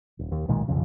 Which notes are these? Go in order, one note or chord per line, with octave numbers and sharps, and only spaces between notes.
D#1
D#2
B1 A#2 D#3 G#3
F1 B1 F2 C#3